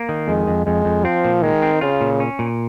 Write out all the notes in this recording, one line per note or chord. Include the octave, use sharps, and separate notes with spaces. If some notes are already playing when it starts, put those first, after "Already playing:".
Already playing: A#3
D#3
F2 G#3
F2
F2 G#3
F2
F3 C4
A#2
D#3 G#3
C4
C#3 F4
A#2
C#4
A#2